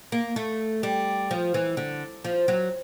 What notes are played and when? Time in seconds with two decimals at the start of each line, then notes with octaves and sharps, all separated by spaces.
0.12 A#3
0.36 A3
0.83 G3
1.31 F3
1.54 E3
1.77 D3
2.24 F3
2.48 F#3